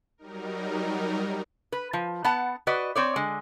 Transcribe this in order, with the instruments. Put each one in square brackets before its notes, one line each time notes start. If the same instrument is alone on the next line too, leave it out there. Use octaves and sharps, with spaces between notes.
[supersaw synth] F#3 G3 D#4 A#4
[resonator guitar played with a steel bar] B4
F3
B3 F#5 A5
F#4 B4 D5 D#5
C4 C#5 D5
D3 G#3